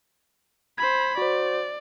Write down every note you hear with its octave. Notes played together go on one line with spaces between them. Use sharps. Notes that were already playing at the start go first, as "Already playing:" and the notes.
C5 B5 G#6
F#4 C5 D5